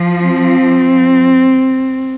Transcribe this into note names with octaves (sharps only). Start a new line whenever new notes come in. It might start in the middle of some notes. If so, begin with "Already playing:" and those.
Already playing: F3
C4